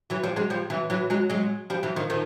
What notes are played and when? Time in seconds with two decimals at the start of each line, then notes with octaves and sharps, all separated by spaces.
0.10 E3 F#3
0.24 F3 G3
0.36 F#3 G#3
0.50 F3 G3
0.70 E3 F#3
0.90 E3 F#3
1.10 F#3 G#3
1.30 F#3 G#3
1.70 F3 G3
1.83 E3 F#3
1.96 D#3 F3
2.10 D#3 F3